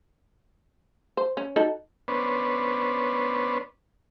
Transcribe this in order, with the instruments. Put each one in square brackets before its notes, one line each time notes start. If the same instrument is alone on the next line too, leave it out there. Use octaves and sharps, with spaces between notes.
[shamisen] C5
C#4
D#4 F#4 A4
[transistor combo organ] B3 C#4 D4 B4 C5